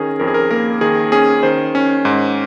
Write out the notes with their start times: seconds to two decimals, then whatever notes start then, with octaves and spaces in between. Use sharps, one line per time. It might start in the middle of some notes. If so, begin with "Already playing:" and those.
Already playing: D#3 C#4 G#4 A#4
0.20 F2 A#4
0.28 G#4
0.34 A#4
0.51 A#3 A#4
0.81 D#3 G#4
1.12 C#4 G#4
1.43 D#3 C5
1.75 C#4
2.05 G#2